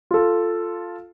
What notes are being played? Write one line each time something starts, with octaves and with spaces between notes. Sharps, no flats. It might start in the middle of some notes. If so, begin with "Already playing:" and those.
F4 A4